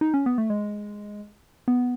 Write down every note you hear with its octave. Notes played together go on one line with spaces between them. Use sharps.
D#4
C#4
B3
A3
G#3
B3